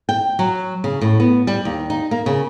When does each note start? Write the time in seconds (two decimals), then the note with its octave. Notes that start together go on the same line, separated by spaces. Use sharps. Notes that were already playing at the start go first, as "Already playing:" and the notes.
0.09 G5
0.39 F#3
0.84 C#3
1.01 A2
1.20 B3
1.47 G3
1.65 D#2
1.90 D#4
2.11 A#3
2.26 C#3